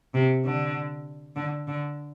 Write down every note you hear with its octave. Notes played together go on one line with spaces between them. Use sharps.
C3
D3
D3
D3